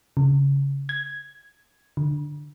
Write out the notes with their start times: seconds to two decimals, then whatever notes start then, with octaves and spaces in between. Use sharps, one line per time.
0.17 C#3
0.89 G#6
1.97 D3